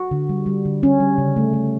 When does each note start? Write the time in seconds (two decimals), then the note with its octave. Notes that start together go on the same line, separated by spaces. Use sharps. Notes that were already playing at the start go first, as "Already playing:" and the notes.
Already playing: F#4
0.11 D3
0.29 G3
0.46 G3
0.65 D3
0.83 G3 C#4
1.00 G3
1.18 C#3
1.36 A3
1.53 A3